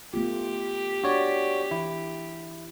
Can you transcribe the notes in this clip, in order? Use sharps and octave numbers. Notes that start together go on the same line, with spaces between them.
A3 B3 F4 G4
D4 F#4 C#5 D5
E3 E4